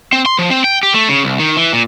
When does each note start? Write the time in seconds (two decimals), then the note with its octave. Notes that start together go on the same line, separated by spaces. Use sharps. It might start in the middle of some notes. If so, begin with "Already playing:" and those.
0.13 C4
0.26 C6
0.39 F3
0.50 C4
0.64 G5
0.83 G4
0.94 A3
1.09 C#3
1.24 C2
1.39 D#3
1.57 E3
1.73 A#2